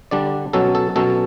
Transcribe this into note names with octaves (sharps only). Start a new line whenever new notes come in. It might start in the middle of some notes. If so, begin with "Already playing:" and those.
D3 G3 D4 D5
B2 F#3 C#4 A4
A4
B2 F#3 C#4 A4